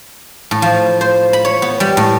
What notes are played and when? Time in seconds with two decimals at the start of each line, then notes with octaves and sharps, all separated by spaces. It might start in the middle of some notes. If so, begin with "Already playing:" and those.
0.51 A2
0.62 F3
1.01 C5
1.33 B5
1.45 C#5
1.62 B3
1.80 G3
1.97 A2